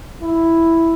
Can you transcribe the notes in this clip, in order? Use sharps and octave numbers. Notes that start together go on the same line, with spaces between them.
E4